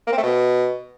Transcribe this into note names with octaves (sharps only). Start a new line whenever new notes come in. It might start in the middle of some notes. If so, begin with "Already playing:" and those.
A#3
C4
A3
B2